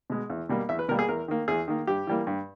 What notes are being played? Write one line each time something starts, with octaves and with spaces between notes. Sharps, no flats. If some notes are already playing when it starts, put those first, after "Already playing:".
B2 G#3
E2
B2 G3 A#3
E2 E5
B4
B2 G3 A#3 A#4
G#4
E2 A#4
D#3 A#3
E2 G#4
D#3 A#3
G2 G4
E3 G3 A#3
G2